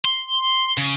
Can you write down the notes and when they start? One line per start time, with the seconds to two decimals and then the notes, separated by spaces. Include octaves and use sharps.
0.05 C6
0.78 C#3